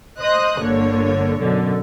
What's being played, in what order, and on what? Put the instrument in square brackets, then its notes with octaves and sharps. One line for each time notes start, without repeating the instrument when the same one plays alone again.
[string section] C5 D#5 C6 D#6 F#6
G1 D3 A#3 C#5
F#2 B2 D3